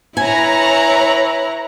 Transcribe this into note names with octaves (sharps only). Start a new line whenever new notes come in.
E4 B4 C#5 G#5 A#5